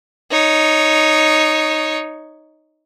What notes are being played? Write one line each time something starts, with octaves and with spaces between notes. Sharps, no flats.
D#4 C#5